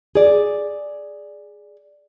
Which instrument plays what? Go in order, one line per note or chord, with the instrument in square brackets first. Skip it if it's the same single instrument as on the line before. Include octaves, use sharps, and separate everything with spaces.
[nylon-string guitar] G#4 D5